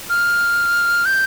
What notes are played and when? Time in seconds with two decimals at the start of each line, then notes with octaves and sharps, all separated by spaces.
0.10 F6
1.05 G6